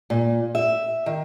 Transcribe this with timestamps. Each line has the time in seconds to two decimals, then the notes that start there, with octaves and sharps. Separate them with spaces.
0.10 A#2
0.55 E5
1.06 D#3